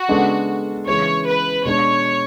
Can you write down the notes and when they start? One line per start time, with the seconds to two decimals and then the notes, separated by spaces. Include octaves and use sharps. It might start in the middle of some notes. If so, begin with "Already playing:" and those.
Already playing: F#4
0.08 C#3 G#3 B3 D4 A4
0.86 C#3 E3 G#3 C#4 G#4 C#5
1.26 B4
1.65 B2 G#3 D4 C#5